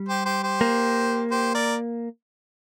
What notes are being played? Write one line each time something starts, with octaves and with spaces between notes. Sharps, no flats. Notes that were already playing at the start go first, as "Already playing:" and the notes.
Already playing: G3
G4 C5
G4 C5
G4 C5
A#3
G4 C5
A#4 D5